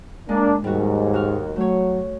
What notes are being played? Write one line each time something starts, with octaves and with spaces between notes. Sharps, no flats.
G#3 A#3 D4
D#2 G#2 G3 F#4
F#4 F6
F#3 A3 C#5